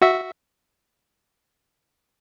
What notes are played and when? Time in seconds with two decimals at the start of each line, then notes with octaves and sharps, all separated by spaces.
0.01 F#4 E5